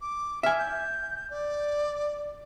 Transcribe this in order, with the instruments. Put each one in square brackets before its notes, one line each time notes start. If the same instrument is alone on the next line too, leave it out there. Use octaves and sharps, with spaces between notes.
[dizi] D6
[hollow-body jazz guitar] E5 G#5 [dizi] F6
[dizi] G6
D5